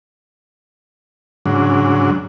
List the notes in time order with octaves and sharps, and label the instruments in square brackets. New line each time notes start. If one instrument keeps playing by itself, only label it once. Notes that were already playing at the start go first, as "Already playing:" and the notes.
[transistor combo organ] G#2 C#3 F#3 D4